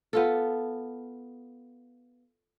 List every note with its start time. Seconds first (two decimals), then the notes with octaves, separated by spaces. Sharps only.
0.13 B3 F4 A4